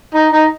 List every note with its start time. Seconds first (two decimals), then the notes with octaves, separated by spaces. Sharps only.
0.14 D#4
0.32 D#4